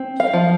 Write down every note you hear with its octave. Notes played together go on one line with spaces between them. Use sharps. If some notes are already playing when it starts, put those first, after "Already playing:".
Already playing: C4
F5
F3